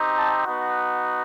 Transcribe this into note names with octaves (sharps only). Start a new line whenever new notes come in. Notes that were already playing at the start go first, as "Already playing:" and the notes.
Already playing: C4 D#4 G4
A5
B3 D#4 F#4